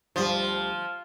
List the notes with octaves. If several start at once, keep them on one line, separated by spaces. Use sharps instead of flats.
D2 F3 G3 G4